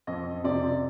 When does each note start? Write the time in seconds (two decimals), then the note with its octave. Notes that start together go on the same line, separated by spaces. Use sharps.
0.07 F2 D#5
0.44 C3 D5